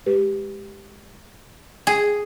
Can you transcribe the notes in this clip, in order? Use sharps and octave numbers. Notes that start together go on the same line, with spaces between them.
G#3 G4 B4
G#4